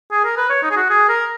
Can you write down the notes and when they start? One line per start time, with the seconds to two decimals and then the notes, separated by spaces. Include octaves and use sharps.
0.12 G#4
0.25 A#4
0.37 B4
0.50 C#5
0.63 D#4
0.71 G#4
0.77 F#4
0.90 G#4
1.09 A#4